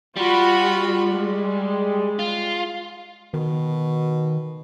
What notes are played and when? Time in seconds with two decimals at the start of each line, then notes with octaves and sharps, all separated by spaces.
0.16 G3 F4 F#4 B5
1.10 G#3
2.19 F4
3.34 B2 D#3